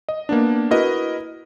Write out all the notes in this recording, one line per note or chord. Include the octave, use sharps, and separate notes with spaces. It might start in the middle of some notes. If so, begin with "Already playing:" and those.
D#5
A#3 B3 D4
E4 F#4 A#4 B4 D#5